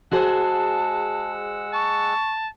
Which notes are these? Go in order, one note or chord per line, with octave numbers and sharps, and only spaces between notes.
G#3 F#4 G#4 C5 F#5 A5 E6
A5 C#6